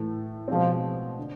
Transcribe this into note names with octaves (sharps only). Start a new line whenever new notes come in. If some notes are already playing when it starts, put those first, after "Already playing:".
Already playing: A2 E3 A3
B2 F3 G#3 C4
D3